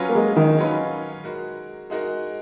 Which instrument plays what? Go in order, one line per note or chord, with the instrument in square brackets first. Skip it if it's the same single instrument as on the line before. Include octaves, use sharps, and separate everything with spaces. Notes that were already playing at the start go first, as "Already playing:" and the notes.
Already playing: [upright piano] F#3 C#4 F4 B4
[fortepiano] A#3
G#3
D#3
[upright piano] F#3 C#4 F4 B4
G#3 D#4 F#4 A#4
G#3 D#4 F#4 A#4